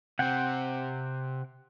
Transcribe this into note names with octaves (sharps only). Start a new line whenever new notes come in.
C3 C4 F#5 G5